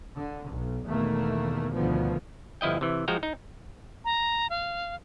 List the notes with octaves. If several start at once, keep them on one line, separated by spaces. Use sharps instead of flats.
D3
B1
E2 B2 D#3 A3 A#3
D2 B2 D#3 F3 B3
G1 F3 E4 D#5 G5
C3 E3
F3 G#3 F#4 G5 A#5
D#4
A#5
F5